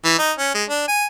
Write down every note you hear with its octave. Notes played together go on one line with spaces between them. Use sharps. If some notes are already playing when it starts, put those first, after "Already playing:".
E3
D#4
C#4
G#3
D4
G#5